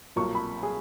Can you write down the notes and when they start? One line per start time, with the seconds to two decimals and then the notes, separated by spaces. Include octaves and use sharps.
0.16 B1 A#2 A#3 C#6
0.35 B5
0.63 G#4